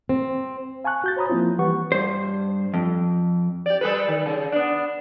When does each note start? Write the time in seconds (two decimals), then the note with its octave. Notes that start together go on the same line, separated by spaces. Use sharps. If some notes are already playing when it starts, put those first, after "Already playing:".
0.09 C4
0.84 F5 G#5 A5 C#6 F#6
1.04 F#4 G6 A6
1.17 C5 C#5 A#5 B5 D#6
1.30 F3 A#3 C4 E4 F4
1.58 E3 G3 G4 B4 F#5 C#6
1.92 G2 C5
2.74 F2
3.66 G4 D5
3.81 G3 A4 B4
4.08 D#3
4.26 C#3
4.52 B3 D4